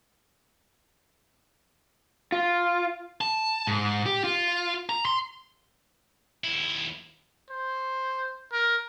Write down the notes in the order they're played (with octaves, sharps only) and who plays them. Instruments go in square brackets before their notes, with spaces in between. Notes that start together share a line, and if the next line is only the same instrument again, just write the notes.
[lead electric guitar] F4
A5
G#2
G4
F4
A#5
C6
[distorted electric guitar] D#2 E4
[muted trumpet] C5
A#4